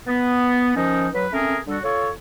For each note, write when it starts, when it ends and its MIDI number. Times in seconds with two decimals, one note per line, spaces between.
0.07 0.76 59
0.76 1.08 51
0.76 1.08 53
0.76 1.08 61
0.76 1.08 63
1.14 1.27 54
1.14 1.27 71
1.32 1.58 57
1.32 1.58 60
1.32 1.58 61
1.32 1.58 68
1.32 1.58 70
1.67 1.78 50
1.67 1.78 55
1.67 1.78 62
1.67 1.78 66
1.67 1.78 69
1.83 2.10 65
1.83 2.10 69
1.83 2.10 73